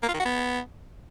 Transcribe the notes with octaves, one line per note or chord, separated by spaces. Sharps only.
A#3
F4
D#3
F#4
B3